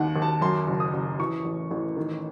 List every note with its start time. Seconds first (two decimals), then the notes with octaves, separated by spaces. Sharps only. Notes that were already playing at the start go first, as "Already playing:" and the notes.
Already playing: D#2 D#3 F#5
0.16 D#2
0.22 A5
0.41 F#2 C6
0.67 F#1
0.80 D#6
0.93 F#1
1.19 E3 C#6
1.45 A1
1.71 A1
1.96 D#3